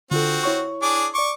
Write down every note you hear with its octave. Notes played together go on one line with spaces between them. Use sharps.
D3 C4 F4 F#4 A4
E4 C#5 C#6
D4 G#4 D6
D5 C#6 D6 C#7